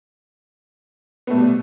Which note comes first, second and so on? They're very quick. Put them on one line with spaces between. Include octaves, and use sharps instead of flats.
B3 A3 B2 G3